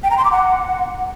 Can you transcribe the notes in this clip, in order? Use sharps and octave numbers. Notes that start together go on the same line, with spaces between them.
G5
A#5
C6
D6
F#5